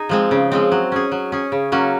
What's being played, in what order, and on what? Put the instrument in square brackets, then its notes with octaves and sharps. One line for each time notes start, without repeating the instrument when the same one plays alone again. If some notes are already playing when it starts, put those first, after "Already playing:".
Already playing: [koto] D#4 G#4
F3 G#3 C4
C#3
F3 G#3 C4
F#3
C#4 G#4
F#3
C#4 G#4
C#3
F#3 A#3 C#4